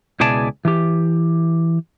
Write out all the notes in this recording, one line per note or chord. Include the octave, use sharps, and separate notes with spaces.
C#2 B2 E4 G#4 D5 A5
E3 G4